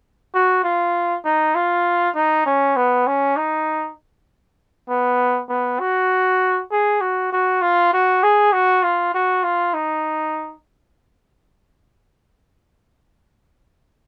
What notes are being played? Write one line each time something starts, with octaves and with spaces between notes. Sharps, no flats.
F#4
F4
D#4
F4
D#4
C#4
B3
C#4
D#4
B3
B3
F#4
G#4
F#4
F#4
F4
F#4
G#4
F#4
F4
F#4
F4
D#4